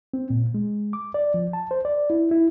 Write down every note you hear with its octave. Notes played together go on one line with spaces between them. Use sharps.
C4
A#2
G#3
D6
D5
F3
A5
C5
D5
E4
E4